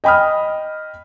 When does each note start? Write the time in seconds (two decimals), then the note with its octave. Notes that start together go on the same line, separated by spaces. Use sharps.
0.04 D#5 G5 B5 D#6 F6